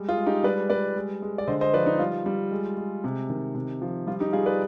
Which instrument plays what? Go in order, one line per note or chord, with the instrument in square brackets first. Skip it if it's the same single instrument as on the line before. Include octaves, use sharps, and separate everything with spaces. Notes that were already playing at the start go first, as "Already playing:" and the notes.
Already playing: [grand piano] G3 G#3
F4 G#4
G#3
D#4 G4
G3 B4 D5
G3 B4 D5
G#3
G#3
D5
D3 C5 D#5
C5 D#5
F3 B4 D5
D#4
G3 F4
G3
G#3
G#3
C3
D#3
C3
F3
G3 F4
D#4 G4
G3 F4 G#4
B4 D5